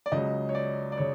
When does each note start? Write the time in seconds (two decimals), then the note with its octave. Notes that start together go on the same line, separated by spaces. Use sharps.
0.06 D5
0.12 C#2 C#3 F#3 D#5
0.49 C#5
0.55 D5
0.92 D5
0.97 C#3 C#5